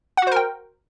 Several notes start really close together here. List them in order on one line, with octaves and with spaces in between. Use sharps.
F#5 F#4 C5 A#4 G5